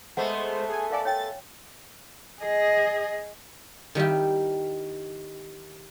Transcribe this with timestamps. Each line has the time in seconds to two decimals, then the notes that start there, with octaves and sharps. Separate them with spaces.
0.17 G#3 A3 B3 C5 F#5
0.67 G#4 G#5
0.91 A4 A#4 D5 F5 G#5
1.05 C#5 G5 A6
2.43 G#4 D#5
3.95 D#3 G3 E4 G4